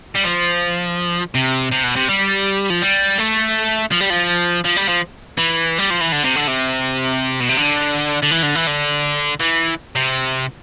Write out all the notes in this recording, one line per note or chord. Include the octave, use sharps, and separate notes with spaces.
G3
F3
C3
C3
B2
C3
G3
F3
G3
A3
F3
G3
F3
F3
G3
F3
E3
G3
F3
E3
D3
C3
D3
C3
B2
C3
D3
D3
E3
D3
E3
D3
E3
C3